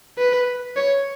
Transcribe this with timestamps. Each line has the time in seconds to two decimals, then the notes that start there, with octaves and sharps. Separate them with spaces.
0.18 B4
0.76 C#5